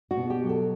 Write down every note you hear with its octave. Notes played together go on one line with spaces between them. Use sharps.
F#4
B2
G4
F#3
A4